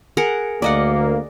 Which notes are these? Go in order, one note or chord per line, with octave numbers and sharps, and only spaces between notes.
G#4 A#4 F#5
D2 A#3 D5 D#5 F#5